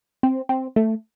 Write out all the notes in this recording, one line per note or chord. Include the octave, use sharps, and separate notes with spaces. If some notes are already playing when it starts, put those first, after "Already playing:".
C4
C4
A3